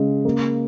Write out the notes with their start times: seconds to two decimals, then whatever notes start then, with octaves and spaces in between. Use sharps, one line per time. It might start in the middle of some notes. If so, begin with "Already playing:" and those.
Already playing: C#3 G#3
0.25 A#3